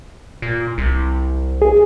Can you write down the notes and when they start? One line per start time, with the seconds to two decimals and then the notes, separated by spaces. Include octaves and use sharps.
0.42 A#2
0.78 C2
1.62 G#4